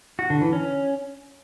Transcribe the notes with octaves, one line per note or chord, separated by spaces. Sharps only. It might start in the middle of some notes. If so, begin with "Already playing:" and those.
F#4
D3
E3
C#4